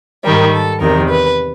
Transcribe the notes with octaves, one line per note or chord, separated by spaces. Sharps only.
G#2 D#3 G3 A#4
A4
E2 C3 D#3 A#4
B4